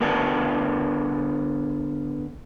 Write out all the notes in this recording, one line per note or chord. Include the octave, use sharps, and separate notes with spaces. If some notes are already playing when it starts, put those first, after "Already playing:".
D3 B3 A#4 B4 D5 A5